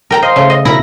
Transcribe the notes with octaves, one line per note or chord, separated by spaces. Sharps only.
A#4 G5 A#5
C5 D#5 F5 C6
C#3 A3
D#5
B2 E4 A#4 B5 A#6